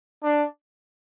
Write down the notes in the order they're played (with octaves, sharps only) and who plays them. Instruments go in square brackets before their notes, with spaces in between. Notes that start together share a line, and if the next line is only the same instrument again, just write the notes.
[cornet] D4